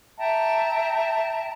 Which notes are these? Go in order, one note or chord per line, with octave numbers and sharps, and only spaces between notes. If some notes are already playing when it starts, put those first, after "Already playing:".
E5 G5 A5 A#5